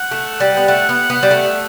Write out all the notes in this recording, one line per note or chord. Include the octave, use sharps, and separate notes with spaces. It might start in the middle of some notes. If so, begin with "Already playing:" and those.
Already playing: F#5
A3
G3
B3
A3 F#5
B3
B3 F#5
G3
A3